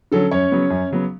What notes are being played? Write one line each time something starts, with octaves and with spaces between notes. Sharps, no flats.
D3 F#3 C#4 A4
F#2 C#4 C#5
C#3 F#3 B3
F#2
C#3 F#3 B3